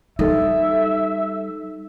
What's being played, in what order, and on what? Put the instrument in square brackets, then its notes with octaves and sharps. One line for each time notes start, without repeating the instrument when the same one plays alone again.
[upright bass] G3 [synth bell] D#4 A4 [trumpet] E5